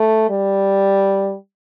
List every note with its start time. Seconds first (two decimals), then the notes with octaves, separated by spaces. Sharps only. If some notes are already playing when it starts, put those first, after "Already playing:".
Already playing: A3
0.29 G3